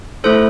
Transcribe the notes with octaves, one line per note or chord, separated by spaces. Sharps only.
A3 E4 A4 C5